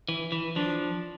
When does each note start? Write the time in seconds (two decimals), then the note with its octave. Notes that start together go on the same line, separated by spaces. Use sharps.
0.09 E3
0.32 E3
0.56 F3 D4